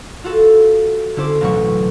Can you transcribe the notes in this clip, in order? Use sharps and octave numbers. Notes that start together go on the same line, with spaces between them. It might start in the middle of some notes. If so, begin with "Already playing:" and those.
F4 F#4 A4
D3 C#4 E4 C5 D6
A1 D2 B2 F#3 C#6